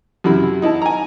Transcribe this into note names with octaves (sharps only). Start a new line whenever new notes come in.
F#2 C3 E4 B5
D#4 E4 A5
G#5 A#5